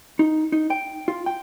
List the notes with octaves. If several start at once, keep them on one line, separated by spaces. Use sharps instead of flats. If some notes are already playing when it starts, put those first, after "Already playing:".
D#4
D#4
G5
F4
G5